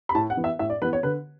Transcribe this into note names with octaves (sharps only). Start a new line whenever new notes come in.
B5
A2 A5
F#5
E3 B3
E5
A2 E5
D5
E3 B3 B4
C#5
D3 B4